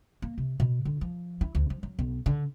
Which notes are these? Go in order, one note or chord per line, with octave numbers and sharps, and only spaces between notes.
A#3
C3
B2
D3
F3
E4
D2
F3
F#3
B1
D3